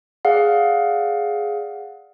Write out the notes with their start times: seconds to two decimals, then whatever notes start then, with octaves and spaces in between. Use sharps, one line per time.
0.25 G#4 D5 F5 F#5